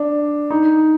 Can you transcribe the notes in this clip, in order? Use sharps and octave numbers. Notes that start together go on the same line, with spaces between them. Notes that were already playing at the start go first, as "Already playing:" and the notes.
Already playing: D4
D#4